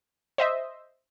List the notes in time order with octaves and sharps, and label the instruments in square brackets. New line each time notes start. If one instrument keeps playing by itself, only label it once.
[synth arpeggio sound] C5 D#5 E5